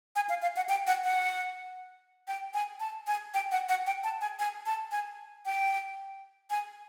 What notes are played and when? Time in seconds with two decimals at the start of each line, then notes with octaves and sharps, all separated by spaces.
0.16 G#5
0.29 F5
0.42 F5
0.56 F#5
0.69 G5
0.87 F#5
1.04 F#5
2.28 G5
2.54 G#5
2.80 A5
3.07 G#5
3.34 G5
3.52 F#5
3.69 F#5
3.86 G5
4.04 A5
4.21 G#5
4.39 G#5
4.66 A5
4.91 G#5
5.46 G5
6.50 G#5